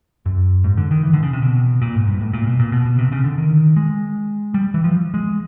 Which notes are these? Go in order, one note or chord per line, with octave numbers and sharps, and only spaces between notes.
F#2
G#2
D3
D#3
E3
D3
C#3
C3
B2
A#2
G#2
G2
A2
A#2
B2
A#2
B2
B2
C3
C#3
D3
D#3
G#3
G3
E3
F3
G#3